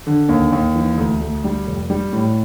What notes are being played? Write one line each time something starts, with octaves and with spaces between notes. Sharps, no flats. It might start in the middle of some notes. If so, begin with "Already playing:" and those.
D3
D#2
D#2
E3
D2
D2
G3
F1
G3
A2